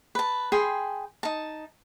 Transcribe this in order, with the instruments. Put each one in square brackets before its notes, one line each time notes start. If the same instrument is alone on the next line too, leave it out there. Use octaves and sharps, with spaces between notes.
[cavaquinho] B4 A5
G#4 G5 B5 C6
D#4 A5